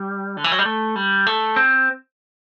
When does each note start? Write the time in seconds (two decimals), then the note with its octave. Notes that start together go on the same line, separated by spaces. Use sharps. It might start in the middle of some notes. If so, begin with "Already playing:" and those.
Already playing: G3
0.37 D3
0.44 E3
0.52 F#3
0.59 G3
0.65 A3
0.96 G3
1.27 A3
1.56 C4